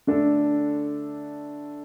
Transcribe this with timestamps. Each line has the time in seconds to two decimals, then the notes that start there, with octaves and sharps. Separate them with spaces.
0.07 D3 A3 D4 A4